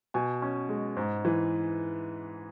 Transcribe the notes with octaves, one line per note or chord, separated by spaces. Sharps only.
B2 G#5
C#4
G#3
G#2
E3